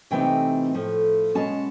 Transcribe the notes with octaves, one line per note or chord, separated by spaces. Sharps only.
C3 E3 A3 C4 D#4 G5
A2 F3 A3
B2 G#3 C#4 A5